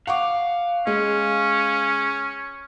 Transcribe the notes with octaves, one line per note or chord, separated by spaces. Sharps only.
F5 F#5 C#6 D6
G#3 C#4